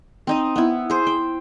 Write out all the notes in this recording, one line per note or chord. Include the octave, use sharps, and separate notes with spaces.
C4 D#4 D#5
B3 E4
G#4 C5
G5